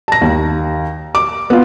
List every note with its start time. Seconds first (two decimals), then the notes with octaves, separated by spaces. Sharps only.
0.08 A5 A#6
0.21 D#2
1.15 D6
1.50 B3 F4